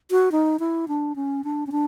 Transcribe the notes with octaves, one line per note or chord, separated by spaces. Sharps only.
F#4
D#4
E4
D4
C#4
D4
C#4
D4